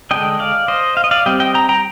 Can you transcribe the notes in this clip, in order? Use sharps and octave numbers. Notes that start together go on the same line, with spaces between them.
D3 G#3 D4 D#5 G5
D5 F5
C5 D#5
F5
D#5
D5 F5
G3 C4 D#5 G5
D#5 G5
G5 A#5
G5 A#5